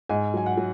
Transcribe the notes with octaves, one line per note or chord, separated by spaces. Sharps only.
G#2 G#5
F#3 G#5
F#5
F#3